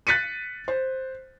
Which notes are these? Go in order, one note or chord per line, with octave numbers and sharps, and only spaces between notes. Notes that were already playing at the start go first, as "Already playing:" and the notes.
F#6 A6 B6 C#7 D#7
C5